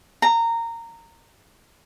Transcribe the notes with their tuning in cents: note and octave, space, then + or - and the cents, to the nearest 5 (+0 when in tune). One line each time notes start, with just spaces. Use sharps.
A#5 -15